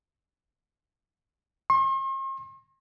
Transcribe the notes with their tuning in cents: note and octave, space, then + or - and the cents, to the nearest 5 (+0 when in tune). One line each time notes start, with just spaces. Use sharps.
C6 +45